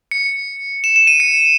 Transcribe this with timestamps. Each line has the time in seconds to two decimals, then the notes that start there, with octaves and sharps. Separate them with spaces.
0.11 C#7
0.84 E7
0.96 E7
1.07 D#7
1.20 C#7